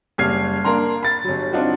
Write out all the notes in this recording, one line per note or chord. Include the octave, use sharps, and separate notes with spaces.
F#1 G3 F6 G#6 C7
A#3 D4 A#5 C6
B5 A6
G1 F#3
C4 D4 D#4 F4 F#4